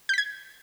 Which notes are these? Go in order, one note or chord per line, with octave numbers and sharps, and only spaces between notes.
G6 G#6 B6